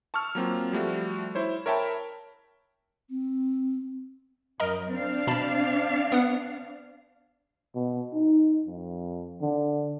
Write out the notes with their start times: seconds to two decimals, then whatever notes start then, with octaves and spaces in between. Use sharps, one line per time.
0.14 A5 C#6 E6 F6
0.35 F#3 A#3 C4 F4
0.72 F3 G3 A3 F#4
1.35 E4 C5 C#5
1.66 A#4 C#5 E5 G5 A5 B5
3.10 C4
4.60 F#2 A#4 D#5 A#5
4.91 C4 D4 F5
5.27 B2 A5 B5
6.12 B3 F#5
7.75 B2
8.14 D#4
8.66 F2
9.42 D3